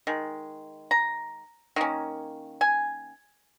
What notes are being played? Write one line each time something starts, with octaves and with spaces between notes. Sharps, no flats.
D#3 G#3
A#5
D#3 A#3 C#4
G#5